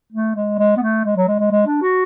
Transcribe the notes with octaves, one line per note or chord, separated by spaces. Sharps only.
A3
G#3
G#3
B3
A3
G#3
F#3
G#3
G#3
G#3
D4
F#4